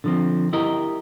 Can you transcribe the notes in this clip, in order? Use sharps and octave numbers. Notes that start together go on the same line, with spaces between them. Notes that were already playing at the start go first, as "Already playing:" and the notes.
D3 F3 C4
E4 G4 A#4 D#5